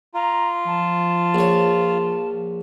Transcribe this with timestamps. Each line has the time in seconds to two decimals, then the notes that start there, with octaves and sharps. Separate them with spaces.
0.14 F4 A#5
0.66 F3 A5
1.35 A#1 C#5